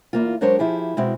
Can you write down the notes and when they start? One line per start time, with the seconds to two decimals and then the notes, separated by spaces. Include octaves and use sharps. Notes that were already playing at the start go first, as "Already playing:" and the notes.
0.13 E2 G#2 A#3 F4
0.41 F#3 G#3 D4 A#4 C5 C#5
0.59 F3 E4 G4 G#4
0.97 B2 G#3 C4 E4 F#4